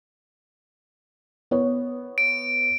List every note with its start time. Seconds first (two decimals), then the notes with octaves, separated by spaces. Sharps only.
1.51 B3 C#5
2.18 D7